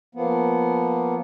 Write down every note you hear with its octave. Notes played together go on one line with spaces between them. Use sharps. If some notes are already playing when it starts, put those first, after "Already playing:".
F3 A#3 B3